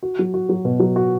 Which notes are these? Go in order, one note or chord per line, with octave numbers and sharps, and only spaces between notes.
F#4
F#3
F#4
F#3
B2
F#3
F#4